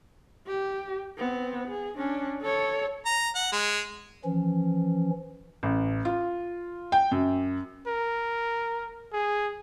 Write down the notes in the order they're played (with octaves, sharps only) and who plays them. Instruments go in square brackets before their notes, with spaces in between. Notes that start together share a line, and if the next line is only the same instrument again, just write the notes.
[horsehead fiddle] G4
B3 C4
G#4
C#4 D4
A4 C#5
[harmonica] A#5
F#5
G#3
[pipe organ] E3 F3 C#4
[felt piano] A1
F4
G5
F#2
[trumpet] A#4
G#4